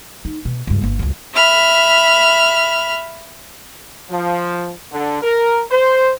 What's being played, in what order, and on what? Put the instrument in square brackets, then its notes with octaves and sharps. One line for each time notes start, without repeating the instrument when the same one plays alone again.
[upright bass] D#4
B2
C#2 G2
G1 A#3
C#2 F#2
[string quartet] E5 B5 F6
[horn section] F3
D3
A#4
C5